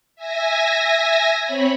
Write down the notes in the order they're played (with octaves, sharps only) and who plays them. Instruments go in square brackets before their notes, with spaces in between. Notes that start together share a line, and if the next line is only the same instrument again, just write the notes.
[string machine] E5 G#5 A#6
C4 C#5 B5